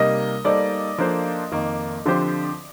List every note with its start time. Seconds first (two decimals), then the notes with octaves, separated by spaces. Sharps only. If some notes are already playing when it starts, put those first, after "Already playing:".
Already playing: C3 G3 A#3 D#4 A#4 D#5
0.44 G3 A#3 D#4 A4 C5 D5
0.98 F3 A#3 D4 A4 C5
1.52 F2 D#3 A#3
2.06 D3 F3 C4 G4 C5